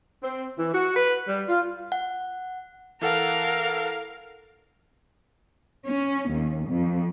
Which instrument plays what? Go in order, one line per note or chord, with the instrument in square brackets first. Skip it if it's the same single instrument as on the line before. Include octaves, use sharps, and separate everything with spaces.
[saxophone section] C4
E3
F#4
B4
G3
F4
[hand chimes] F#5
[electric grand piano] E3 A4 F#5 [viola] A#4 F5
[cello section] C#4
D#2
F2